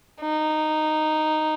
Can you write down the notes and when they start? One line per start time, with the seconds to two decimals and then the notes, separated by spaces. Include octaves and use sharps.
0.21 D#4